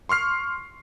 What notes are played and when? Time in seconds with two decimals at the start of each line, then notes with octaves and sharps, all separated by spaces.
0.09 C6 C#6 F6 C7